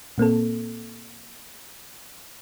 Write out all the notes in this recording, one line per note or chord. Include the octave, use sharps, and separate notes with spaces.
A#2 A#3 C4 A4